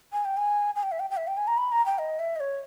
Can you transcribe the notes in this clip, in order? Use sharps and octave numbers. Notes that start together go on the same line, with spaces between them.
G#5
G5
G#5
G#5
G5
E5
G5
G5
E5
G5
G#5
A#5
B5
A#5
G5
D#5
E5
D#5
C#5